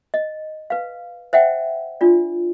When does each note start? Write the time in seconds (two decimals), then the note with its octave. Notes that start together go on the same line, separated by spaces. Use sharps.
0.14 D#5
0.70 B4 F5
1.33 C5 E5 F#5 G5
2.01 D4 F4 D5